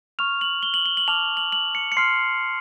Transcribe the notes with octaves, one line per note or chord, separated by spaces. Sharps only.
C#6 F6 F7
F#7
G7
F#7
G7
F#7
A5 D6 F6 F7
F#7
F#7
C#7
C#7
C6 F6 C7